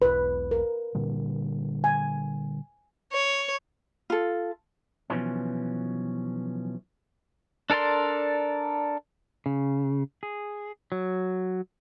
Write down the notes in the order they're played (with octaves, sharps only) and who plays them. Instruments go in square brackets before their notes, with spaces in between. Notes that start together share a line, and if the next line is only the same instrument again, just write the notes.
[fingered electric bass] E1 B1 [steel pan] B4
[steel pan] A#4
[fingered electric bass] A#2 D3 G3
[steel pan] G#5
[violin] C#5
[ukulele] F4 A4
[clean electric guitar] B1 B2 E3 F3 C#4
[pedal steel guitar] D4 A4 A#4 D5 C6
[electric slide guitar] C#3
G#4
F#3